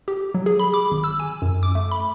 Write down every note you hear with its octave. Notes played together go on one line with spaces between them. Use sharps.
G4
F#3
G#4
B5
D6
G#1
E6
G#5
F#2
D6
A3
B5